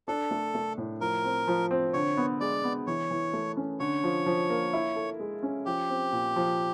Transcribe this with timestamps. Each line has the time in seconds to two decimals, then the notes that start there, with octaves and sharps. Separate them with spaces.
0.08 D4 A4
0.31 A3
0.55 A3
0.78 A2
1.01 F3 A#4
1.24 C4
1.48 F3
1.71 C4
1.93 D3 C#5
2.17 B3
2.40 G#3 D5
2.64 B3
2.87 E3 C#5
3.11 E3
3.33 A3
3.57 C#4
3.79 D3 C#5
4.03 F3
4.26 F3
4.50 A#3
4.73 E4
4.96 A4
5.19 G#3
5.43 C#4
5.66 F3 G4
5.90 C4
6.12 A#2
6.36 F3